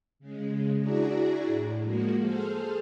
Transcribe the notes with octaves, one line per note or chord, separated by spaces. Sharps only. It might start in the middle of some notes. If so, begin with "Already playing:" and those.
C#3 G#3
D4 E4 F#4 G#4 D5 A#5
A2
F3 G#3 A#3 F#4
G#4 A4 C5 F6